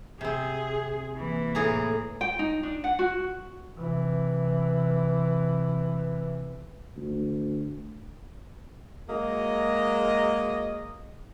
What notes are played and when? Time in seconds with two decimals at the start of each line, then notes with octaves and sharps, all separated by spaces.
0.21 C3 C4 G#4
1.17 E3 A#3
1.55 A2 G#4 A#5
2.21 G5
2.39 D#4
2.63 D4
2.84 F#5
2.99 F#4
3.78 C3 E3
6.97 D2
9.09 F#3 G#3 A#3 D#5